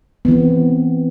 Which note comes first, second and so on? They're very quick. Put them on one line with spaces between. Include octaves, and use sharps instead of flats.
B3 E3 C4